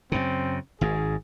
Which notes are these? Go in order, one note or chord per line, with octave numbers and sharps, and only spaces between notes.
F#2 C#3 C4
G#1 G#2 G#4